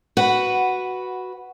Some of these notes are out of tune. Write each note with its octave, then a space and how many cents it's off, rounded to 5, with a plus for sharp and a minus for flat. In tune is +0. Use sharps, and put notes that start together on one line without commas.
F#4 +0 B4 +0 F#5 +10